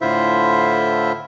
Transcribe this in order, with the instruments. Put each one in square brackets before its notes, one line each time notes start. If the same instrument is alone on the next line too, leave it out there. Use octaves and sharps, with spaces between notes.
[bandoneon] A2 D3 E4 F4 C5 E5